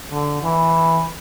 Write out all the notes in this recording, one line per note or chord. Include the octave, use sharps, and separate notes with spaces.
D3
E3